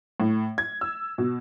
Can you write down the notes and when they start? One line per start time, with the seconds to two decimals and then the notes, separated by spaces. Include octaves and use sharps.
0.20 A2
0.58 G#6
0.81 E6
1.18 B2